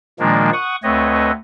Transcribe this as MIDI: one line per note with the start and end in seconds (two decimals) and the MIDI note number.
0.19 0.50 46
0.19 0.50 51
0.19 0.50 53
0.19 0.50 56
0.19 0.50 58
0.19 0.50 62
0.53 0.76 78
0.53 0.76 85
0.53 0.76 87
0.83 1.31 38
0.83 1.31 57
0.83 1.31 60
0.83 1.31 71
0.83 1.31 73
0.83 1.31 75